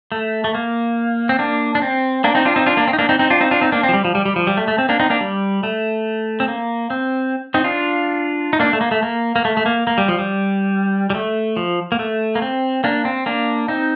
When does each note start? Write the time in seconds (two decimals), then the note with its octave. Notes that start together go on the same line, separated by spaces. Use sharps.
0.12 A3
0.44 A3
0.55 A#3
1.29 C4
1.39 A#3 D4
1.75 D4
1.82 C4
2.24 A#3 D4
2.35 C4 D#4
2.45 D4 F4
2.56 C4 D#4
2.66 D4 F4
2.77 A#3 D4
2.88 C4
2.93 D#4
2.99 A#3 D4
3.09 C4 D#4
3.19 C4 D#4
3.30 D4 F4
3.41 C4 D#4
3.51 D4 F4
3.61 C4 D#4
3.72 A#3 D4
3.83 C4
3.89 F3
3.94 G3
4.05 F3
4.15 G3
4.25 G3
4.36 F3
4.47 G3
4.57 A3
4.68 A3
4.78 C4
4.89 A#3 D4
5.00 C4 D#4
5.10 A#3 D4
5.21 G3
5.63 A3
6.40 C4
6.48 A#3
6.90 C4
7.54 C4 D#4
7.64 D4 F4
8.53 D#4
8.60 A#3 D4
8.73 A3
8.81 A#3
8.91 A3
9.03 A#3
9.36 A#3
9.45 A3
9.57 A3
9.66 A#3
9.87 A#3
9.98 G3
10.08 F3
10.19 G3
11.10 G3
11.15 A3
11.57 F3
11.92 A#3
11.99 A3
12.35 A#3
12.42 C4
12.84 A#3 D4
13.05 C4
13.26 A#3 D4
13.68 C4 D#4